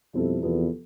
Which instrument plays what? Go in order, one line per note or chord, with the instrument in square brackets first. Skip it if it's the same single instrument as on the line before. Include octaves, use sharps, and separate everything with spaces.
[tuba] F2 [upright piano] B2 G3 C4 E4 A4
[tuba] E2 [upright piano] C3 F3 B3 F4 A4